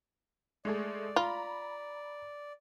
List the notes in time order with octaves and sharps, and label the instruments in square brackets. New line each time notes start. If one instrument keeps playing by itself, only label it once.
[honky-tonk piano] G#3 A3 G#4 [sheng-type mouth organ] D5
[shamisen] F4 [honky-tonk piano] A#5 B5